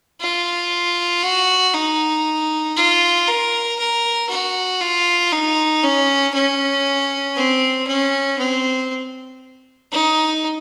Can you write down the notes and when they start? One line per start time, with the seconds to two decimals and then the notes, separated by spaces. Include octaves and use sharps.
0.21 F4
1.23 F#4
1.74 D#4
2.76 F4
3.28 A#4
3.79 A#4
4.29 F#4
4.81 F4
5.32 D#4
5.83 C#4
6.34 C#4
7.36 C4
7.87 C#4
8.39 C4
9.92 D#4